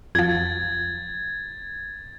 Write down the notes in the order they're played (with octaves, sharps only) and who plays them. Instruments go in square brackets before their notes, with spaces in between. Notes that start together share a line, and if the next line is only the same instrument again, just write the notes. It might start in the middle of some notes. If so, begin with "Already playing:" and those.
[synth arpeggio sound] F2 F3 [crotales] G#6 A6